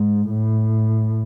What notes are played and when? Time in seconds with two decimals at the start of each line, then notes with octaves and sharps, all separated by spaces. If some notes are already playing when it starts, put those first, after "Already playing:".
Already playing: G#2
0.30 A2